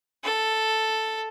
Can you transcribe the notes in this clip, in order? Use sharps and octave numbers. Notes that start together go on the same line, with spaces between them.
A4